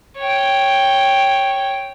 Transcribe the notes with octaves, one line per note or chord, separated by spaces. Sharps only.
C#5 G5